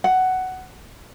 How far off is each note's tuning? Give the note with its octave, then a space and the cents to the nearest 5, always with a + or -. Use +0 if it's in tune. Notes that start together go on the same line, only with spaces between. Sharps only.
F#5 +10